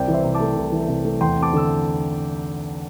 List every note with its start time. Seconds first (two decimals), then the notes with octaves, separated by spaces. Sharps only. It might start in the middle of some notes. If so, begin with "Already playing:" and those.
Already playing: C2 C4 D5 G5
0.08 E3
0.13 C5 E5
0.24 C3
0.35 A5 D6
0.40 A3
0.56 C2
0.72 E3
0.88 C3
1.05 A3
1.21 E2 G5 C6
1.37 C4
1.42 A5 D6
1.53 D3 E6